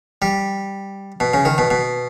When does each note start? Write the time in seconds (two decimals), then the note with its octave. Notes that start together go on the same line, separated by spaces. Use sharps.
0.22 G3
1.20 B2
1.33 C#3
1.45 D#3
1.58 B2
1.70 B2